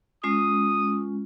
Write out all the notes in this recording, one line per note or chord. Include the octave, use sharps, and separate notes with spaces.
G#3 C#4 F4 D#6